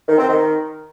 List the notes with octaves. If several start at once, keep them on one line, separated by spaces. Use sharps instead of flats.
D#3
C4
D#3